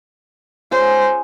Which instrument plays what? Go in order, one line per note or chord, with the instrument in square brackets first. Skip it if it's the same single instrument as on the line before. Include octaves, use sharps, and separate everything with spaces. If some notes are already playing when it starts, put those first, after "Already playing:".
[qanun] C#4 F4 G#4 [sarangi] C5